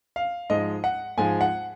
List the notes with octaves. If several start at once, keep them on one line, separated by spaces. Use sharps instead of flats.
F5
G#2 F3 G#3 D#5
F#5
G#2 F3 G#3 G#5
F#5